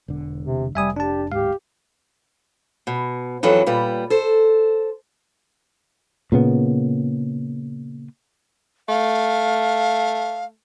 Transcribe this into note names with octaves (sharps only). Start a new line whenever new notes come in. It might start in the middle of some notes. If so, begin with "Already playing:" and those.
E1 D3
C3
F1 G3 E5 G#5 D#6
D4 G4 A5
D1 G#2 G4 F5
B2
F2 E3 F#3 A4
A#2 G3 B4
A4 C5
A#2 C#3 B3
A3 F5